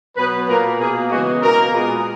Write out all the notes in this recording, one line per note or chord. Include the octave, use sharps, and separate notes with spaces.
B2 F#3 B3 B4
A#2 A#3 A#4
B2 A#3 G#4
C#3 E3 G#3 B3 F#4
B2 A#3 A#4
A#2 G#3 B3